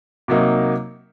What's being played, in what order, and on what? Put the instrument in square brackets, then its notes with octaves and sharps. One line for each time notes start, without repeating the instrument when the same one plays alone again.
[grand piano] C3 F#3 A#3 D#4